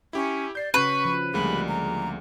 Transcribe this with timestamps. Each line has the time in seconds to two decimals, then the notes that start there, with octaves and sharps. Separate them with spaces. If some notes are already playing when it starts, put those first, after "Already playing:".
0.13 C#4 E4 G4
0.55 D5 G6 C7
0.74 C#3 C#4 F#4 B4 C#6
1.05 F3
1.34 D2 F3 G3 G#3 A#3 G#4 B5
1.68 A#5